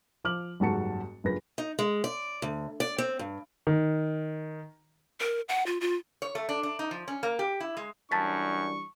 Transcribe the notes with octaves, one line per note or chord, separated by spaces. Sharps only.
F3 D6 F6 F#7
F#1 G#2 G3 F#4 A5 C#7
F#1 G2 F4 B4 A#6
D#4
G#3
D5
D2
D5
C4
G2
D#3
A#4
F#5
F4
F4
C#5
A3
D4
D4
D#4
F3
C#4
A#3
G4
E4
G#3
F#2 E3 G3 D4 A5 C#6 A6 B6